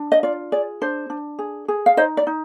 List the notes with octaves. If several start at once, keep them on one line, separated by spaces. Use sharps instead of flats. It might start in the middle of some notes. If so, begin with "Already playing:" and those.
Already playing: D4
D#5
F4 D5
G#4 D5
D4 C5
D4
G#4
G#4
F5
D#4 C5 D#5
D5
D#4